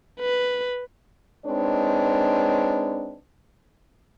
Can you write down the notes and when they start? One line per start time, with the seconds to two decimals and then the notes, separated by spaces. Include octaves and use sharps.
0.20 B4
1.46 G#3 C4 D4 D#4 B4 C#5